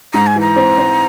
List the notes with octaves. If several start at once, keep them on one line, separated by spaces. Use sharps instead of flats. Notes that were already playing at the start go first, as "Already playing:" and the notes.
G#2 A#5
G#5
E3
A#5
C4
C4